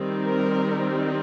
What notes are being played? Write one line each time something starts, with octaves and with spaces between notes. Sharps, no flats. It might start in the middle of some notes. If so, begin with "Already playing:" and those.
Already playing: D#3 G3 C4 D#4
A#4